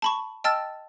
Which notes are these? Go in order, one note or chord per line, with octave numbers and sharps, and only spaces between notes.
A5 B5 C#6
D#5 G5 A5 E6 F6 A6